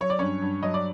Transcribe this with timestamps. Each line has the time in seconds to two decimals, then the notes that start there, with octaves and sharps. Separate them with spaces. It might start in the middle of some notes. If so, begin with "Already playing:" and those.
0.01 F#3 C#5
0.10 D5
0.19 G2 C#4 C#5
0.42 G2
0.63 F#3 D#5
0.74 D5